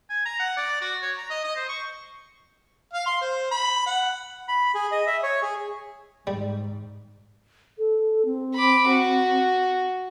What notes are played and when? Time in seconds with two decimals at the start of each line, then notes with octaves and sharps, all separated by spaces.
0.10 G#5
0.25 A#5
0.40 F#5
0.57 D5
0.81 F#4
1.02 C#5
1.18 A#5
1.30 D#5
1.44 D#5
1.56 C5
1.69 C#6
2.93 F5
3.06 C6
3.21 C5
3.51 B5
3.86 F#5
4.48 B5
4.75 G#4
4.91 D#5
5.07 E5
5.23 C#5
5.42 G#4
6.27 G#2 G3
7.78 A4
8.25 C4
8.55 B5 D6
8.91 F#4